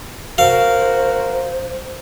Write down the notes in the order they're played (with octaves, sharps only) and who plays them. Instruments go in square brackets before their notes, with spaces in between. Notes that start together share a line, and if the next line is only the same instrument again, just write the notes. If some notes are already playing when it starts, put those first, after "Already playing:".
[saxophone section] F#4 A#4 [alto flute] C5 [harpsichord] F5